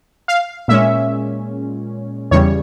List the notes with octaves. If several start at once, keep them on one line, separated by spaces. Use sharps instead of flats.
F5
A#2 G#3 C#4 E5
E2 C#3 G3 C#5